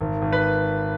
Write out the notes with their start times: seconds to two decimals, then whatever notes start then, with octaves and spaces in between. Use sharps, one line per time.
0.01 G#1
0.22 G#1
0.33 B4